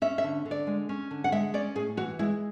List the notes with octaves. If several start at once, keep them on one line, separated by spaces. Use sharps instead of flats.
C#4 E5
E5
D3
D3
D5
G#3
C#4
D3
F#5
G#3 E5
C#4 D5
A2 G#4
E3 F#4
G#3 E4